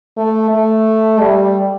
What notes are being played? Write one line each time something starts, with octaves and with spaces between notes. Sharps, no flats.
A3
A3
G3